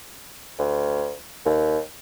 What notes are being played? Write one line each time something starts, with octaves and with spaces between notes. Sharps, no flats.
D2
D#2